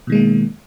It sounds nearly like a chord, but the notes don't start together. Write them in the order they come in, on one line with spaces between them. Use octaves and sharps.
B2 D#3 G#3 A#3